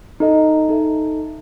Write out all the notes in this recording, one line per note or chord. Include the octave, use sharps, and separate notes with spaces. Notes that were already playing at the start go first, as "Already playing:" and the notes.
D#4 A4 D#5
D#4 A4 E5